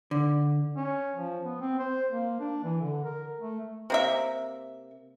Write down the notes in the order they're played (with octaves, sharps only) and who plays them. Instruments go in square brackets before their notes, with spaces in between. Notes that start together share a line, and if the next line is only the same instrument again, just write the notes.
[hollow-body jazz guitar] D3
[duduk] C#4
F3
B3
C4
C5
A#3
D4
E3
D3
A#4
A3
[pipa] C3 A#3 E5